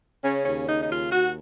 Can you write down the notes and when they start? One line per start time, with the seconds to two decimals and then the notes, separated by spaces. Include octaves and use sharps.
0.23 C#3 C#4
0.45 D#2 C#4
0.67 C#3 D#4
0.81 D#4
0.89 D#2 F4
1.12 D#2 F#4